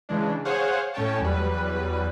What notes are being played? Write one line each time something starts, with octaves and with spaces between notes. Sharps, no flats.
C#3 E3 G#3 D4
G#4 C5 C#5 F5 F#5
A2 C#4 C#5 G5 A5
E2 F#3 G3 B4